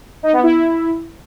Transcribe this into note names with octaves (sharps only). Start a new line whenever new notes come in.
D#4
B3
E4